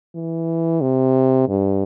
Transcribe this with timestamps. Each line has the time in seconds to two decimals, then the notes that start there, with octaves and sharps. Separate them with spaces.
0.15 E3
0.81 C3
1.48 G2